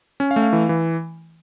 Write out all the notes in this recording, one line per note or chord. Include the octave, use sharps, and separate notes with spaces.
C#4
F5
A3
F5
E3
E3